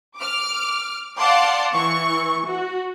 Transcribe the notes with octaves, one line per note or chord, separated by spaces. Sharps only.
D6 F6
D5 F5 F#5 A5 C6 D6
E3 C#6
F#4